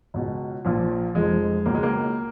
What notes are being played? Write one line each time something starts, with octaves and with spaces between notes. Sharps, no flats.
C#2 B2
A#1 A#2 F3
F1 F2 F3 G#3
C#2 B2 A#3
G#3
A#3